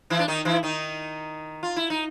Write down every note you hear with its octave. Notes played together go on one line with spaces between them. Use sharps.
E3 E4
D4
D#3 D#4
E3 E4
D#3 D#4
F4
E4
D#4